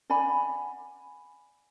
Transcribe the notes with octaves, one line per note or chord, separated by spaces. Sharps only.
D5 F#5 G#5 B5